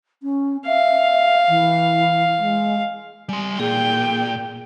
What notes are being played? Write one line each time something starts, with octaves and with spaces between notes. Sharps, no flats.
C#4
E5 F5
E3
G#3
G3 G#5 C6
A#2 G#4 G5